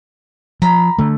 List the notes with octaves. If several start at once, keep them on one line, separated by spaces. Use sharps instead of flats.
F3 A#5 B5
D3 A3